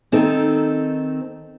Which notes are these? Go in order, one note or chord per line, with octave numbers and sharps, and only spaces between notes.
D#3 C4 D#4 A4